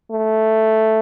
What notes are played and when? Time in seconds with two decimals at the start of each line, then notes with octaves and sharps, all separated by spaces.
0.11 A3